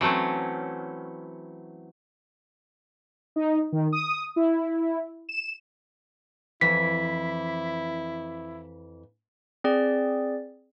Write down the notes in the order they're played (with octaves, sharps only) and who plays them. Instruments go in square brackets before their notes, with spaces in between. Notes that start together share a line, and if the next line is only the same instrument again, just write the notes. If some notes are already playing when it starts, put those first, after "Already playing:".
[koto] E3 F#3 A3 C4 C#4
[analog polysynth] D#4
D#3
D#6
E4
E7
[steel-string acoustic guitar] F2 E3 [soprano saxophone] E4 [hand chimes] B6
[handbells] C4 G#4 D5